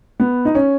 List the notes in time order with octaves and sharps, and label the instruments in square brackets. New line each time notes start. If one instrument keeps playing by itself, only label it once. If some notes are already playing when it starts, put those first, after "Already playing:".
[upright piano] B3
D#4
C#4